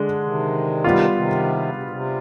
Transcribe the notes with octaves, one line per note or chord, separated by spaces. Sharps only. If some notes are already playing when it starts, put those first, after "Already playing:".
Already playing: D3 G#3 D4
C3 D#3
G3 B3 F4
C3 D#3
C3
B2
C3